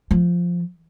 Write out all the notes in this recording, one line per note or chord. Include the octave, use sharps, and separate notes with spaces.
F3